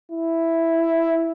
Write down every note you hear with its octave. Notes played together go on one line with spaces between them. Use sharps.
E4